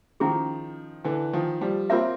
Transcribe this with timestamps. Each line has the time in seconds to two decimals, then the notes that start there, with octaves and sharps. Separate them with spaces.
0.20 D#3 F3 C#4 E4 G#4
1.04 D3 E3
1.33 D#3 F3
1.61 F3 G3
1.90 A#3 C4 F4 A#4 C#5 E5